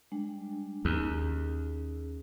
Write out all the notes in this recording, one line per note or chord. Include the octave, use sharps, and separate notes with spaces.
G3 G#3 D4
D#2 C#4 G#4